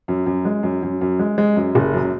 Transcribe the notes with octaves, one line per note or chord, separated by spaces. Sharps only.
F#2
F#2
G#3
F#2
F#2
F#2
G#3
G#3
F#2
F#1
F#2